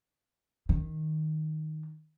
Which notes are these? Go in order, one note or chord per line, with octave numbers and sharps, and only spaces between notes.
D#3